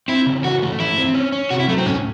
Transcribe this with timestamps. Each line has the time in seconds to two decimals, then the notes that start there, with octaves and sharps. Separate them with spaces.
0.08 C4 E4
0.26 C#3
0.44 E3 F#4
0.62 A3
0.80 E3 E4
0.97 C4
1.14 C#4
1.32 C#4
1.50 C3 F#4
1.60 E4
1.68 F#3 A3
1.78 C4
1.86 A2 C#4